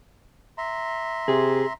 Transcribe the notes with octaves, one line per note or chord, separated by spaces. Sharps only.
E5 A#5 C6
C3 G#4